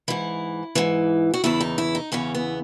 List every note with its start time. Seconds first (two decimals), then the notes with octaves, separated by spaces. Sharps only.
0.08 G#2 E3 E4
0.75 G#2 E3
1.34 F#4
1.44 E2 C#3 E3 E4
1.60 D#4
1.78 E4
1.95 D#4
2.12 E2 C#3 E3 C#4
2.34 B3